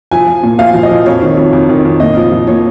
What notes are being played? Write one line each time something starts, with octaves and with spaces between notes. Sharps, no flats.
F3 G#5
F3
A#2
F3 F5
F3
D#5
F3
F2 C#5
D#3
F2
F2
D#3
F2
A#2 D#5
F3
F3
A#2 C#5